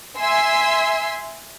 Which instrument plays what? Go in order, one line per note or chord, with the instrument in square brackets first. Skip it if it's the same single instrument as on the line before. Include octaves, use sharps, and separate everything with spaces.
[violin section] E5 G#5 C6 E6